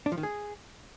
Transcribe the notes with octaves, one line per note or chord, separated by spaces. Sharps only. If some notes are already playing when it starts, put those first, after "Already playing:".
D4
F3
D#3
G#4